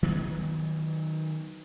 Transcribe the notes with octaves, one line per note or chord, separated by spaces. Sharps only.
D#3 F#3 B3